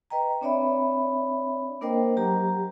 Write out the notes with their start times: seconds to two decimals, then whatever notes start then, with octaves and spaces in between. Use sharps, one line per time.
0.10 B4 D#5 G5 A#5
0.41 C4 D4 C#5 D5 E5 B5
1.81 A#3 D4 A#4 C5 D#5 G5
2.17 F#3 G4 A#5